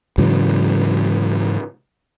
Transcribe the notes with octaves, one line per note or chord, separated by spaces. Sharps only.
G#2 C#3 E3 F#3